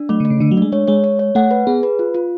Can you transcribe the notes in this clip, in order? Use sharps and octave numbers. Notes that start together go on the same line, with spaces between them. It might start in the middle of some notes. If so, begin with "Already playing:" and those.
Already playing: D4
F#3 A3
D3
A3
C#3
D3 D4
F#3
G#3 D4
G#3 C#5
G#3 C#5
C#5
C#5
A3 F#5
B4
B3 G#4
B4
F4
F4